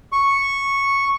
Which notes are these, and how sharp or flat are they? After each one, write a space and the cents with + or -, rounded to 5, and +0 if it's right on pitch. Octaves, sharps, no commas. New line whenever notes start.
C#6 -5